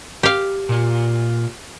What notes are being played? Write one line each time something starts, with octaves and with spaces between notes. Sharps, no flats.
G4 F5
A#2 F4